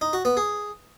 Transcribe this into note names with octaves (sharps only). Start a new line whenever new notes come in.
D#4
F#4
B3
G#4